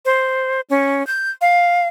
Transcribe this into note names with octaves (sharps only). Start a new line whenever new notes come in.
C5
C#4
G6
F5